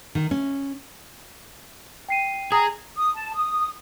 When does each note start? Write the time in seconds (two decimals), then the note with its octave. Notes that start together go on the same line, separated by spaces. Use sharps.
0.15 D#3
0.31 C#4
2.09 G5 C7 D#7
2.52 G#4 A#5 D#6
2.96 D#6
3.14 A5
3.34 D#6